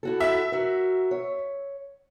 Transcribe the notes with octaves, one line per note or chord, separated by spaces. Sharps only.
E4 F#4 A4
E5
F#4 A#4
C#5